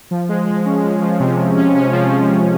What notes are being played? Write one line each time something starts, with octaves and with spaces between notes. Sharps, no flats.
F3
G#3
G#3
C#4
G#3
F3
C3
C3
C#4
C#4
F3
C#4
F3